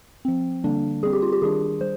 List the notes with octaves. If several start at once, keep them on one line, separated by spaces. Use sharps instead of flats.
F3 C4
D3 G3 A#3 D4
G3 C4 G#4
G4
F4
G4
D#3 G3 D4 G#4
G3 C5